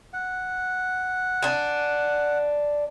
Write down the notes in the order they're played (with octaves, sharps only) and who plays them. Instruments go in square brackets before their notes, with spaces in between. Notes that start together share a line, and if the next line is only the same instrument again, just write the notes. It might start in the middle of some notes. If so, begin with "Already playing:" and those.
[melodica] F#5
[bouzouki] D4 G#5